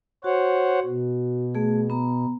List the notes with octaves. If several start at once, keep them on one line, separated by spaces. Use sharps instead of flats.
F#4 C5 C#5 F#5
B2
A3 G#4
B3 A#5